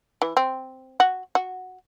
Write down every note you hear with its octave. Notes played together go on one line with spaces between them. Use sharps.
E3
C4
F#4
F#4